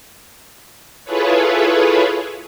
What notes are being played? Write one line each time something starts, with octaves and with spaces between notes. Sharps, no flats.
E4 F4 G#4 A4 B4 C#5